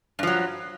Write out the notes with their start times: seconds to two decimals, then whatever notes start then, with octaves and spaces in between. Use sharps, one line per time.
0.19 G2
0.23 F3
0.27 F#3